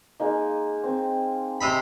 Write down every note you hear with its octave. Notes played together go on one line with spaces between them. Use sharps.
G#3 A#3 D#4
C4
C3 D#4 B5